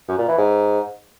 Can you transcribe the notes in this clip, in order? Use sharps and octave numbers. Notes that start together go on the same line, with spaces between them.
F#2
A#2
E3
G#2